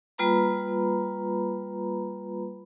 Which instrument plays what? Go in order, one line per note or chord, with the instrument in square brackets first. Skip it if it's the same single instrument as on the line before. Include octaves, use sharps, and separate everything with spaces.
[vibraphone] G3 A#3 F4 B4 A#5 B5